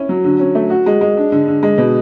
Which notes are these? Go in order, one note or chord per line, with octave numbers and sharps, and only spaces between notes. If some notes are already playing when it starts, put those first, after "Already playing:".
Already playing: C#4 E4
F#3
D3
C#4
A3
F#4
G#3
G#3
D4
D3
D3
G#3
B2